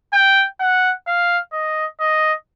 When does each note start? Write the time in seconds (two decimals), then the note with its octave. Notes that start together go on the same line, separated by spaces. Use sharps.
0.13 G5
0.60 F#5
1.07 F5
1.53 D#5
2.00 D#5